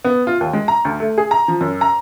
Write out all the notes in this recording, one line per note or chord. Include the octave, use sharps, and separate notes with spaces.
B3
F4
D#2
G#3
A#5
D2
A3
G#4
A#5
F3
F#2
A#5